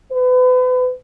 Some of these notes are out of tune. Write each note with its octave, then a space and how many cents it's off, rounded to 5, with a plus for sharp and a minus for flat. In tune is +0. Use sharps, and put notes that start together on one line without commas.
B4 +35